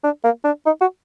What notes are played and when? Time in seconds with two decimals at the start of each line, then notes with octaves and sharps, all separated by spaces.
0.04 D4
0.24 A#3
0.44 D4
0.66 D#4
0.81 F#4